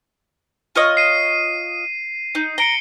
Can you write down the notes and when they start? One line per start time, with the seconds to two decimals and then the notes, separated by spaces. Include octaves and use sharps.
0.76 F4 C#5 D#5
0.97 C7 D#7
2.35 D#4
2.58 A#5 C#7 D7 G7